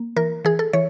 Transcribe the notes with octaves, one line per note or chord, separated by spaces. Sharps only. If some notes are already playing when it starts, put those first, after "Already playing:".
Already playing: A#3
E3 A#4
E3 G#4
A4
E3 C#5